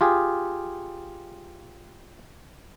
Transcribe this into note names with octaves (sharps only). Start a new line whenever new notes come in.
F4 G4 G#4